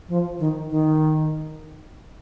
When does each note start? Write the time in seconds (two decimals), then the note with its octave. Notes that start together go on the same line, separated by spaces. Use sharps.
0.09 F3
0.39 D#3
0.70 D#3